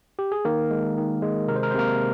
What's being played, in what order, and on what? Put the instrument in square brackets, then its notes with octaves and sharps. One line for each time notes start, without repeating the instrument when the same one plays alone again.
[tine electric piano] G4
G#4
D#3 A#3 A#4
G#3
D#3
G#3
C3 A#4
C5
A#4
C5
C3 A#3 A#4